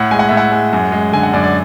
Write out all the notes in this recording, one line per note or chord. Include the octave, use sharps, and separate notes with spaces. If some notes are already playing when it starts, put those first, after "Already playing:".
Already playing: A2 F#5
G#3 G#5
F#5
A2 E5
F#5
G#3
F#2
G#3
D3 G#5
F#5
F#2 D5
D5